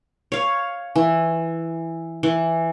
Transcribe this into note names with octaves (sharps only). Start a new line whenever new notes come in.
C#5 F5
E3
E3